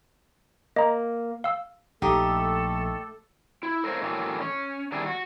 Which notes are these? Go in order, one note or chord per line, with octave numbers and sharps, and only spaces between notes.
A#3 D#5 A#5
F5 E6
A#1 A3 D#4 G4 A4
E4
A4 A#4 C5 C#5 F5
A2 E3 F#3 A3 A#3
C#4
D#3 G3 D4 E4 G#4
F#4